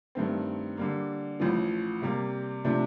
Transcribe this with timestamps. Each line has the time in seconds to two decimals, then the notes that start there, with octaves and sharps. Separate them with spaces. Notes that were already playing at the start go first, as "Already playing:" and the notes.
0.15 G2 D#3 A3 C4
0.77 D3 G3 A#3
1.40 A1 A2 F3
2.02 C3 G3 A#3
2.64 C3 F3 A3 D4